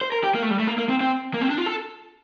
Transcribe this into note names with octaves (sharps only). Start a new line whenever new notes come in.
C5
A#4
G4
A#3
A3
G3
A3
A#3
A#3
C4
C4
A#3
C4
D4
F4
A4